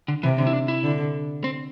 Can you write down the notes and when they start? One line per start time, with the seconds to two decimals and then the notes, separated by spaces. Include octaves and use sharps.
0.08 D3
0.23 C3 E3
0.38 D3
0.47 E4
0.53 D4
0.68 E4
0.83 D3
1.44 C4